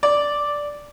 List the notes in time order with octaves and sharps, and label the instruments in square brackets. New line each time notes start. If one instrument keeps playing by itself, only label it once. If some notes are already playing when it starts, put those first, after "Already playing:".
[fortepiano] D5